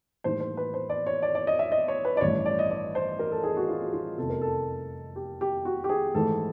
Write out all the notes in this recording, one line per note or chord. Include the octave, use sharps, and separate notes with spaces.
A2 E3 G3 A#3 D#4 C5
C5
B4
C5
D5
C#5
D5
D5
D#5
E5
D#5
C#5
B4
D5
A1 G2 E3 C#5
D5
D#5
D5
C5
A#4
A4
G#4
F#4
F4
F#4
F4
F1 E2 C3 A4
A#4
A4
G4
G4
F#4
G4
G#4
G#2 E3 A3 A4